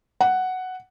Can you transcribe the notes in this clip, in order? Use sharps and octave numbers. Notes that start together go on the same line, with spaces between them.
F#5